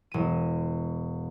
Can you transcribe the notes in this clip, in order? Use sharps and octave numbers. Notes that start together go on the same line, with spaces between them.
E1 D#7